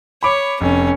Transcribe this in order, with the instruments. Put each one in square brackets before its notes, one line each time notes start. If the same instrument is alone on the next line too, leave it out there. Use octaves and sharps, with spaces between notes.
[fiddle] C#5 [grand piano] B5 D6
[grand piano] F1 [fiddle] C#4